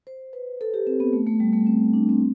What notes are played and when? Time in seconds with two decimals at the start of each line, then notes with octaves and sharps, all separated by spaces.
0.07 C5
0.33 B4
0.61 A4
0.74 G4
0.87 C4
1.00 B3
1.13 A3
1.27 A3
1.40 G3
1.53 A3
1.66 C4
1.93 D4
2.09 C4